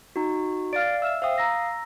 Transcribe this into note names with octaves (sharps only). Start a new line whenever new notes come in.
D#4 F#4
D5 F5 F6 A6 D7
E5 E6 F6 E7
C5 E5 F5 G5 D#6
A#5 E6 A#6